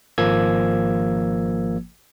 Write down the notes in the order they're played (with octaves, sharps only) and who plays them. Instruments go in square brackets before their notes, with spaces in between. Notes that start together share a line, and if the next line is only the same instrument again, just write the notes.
[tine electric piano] G#1 F3 A#3 E6 G#6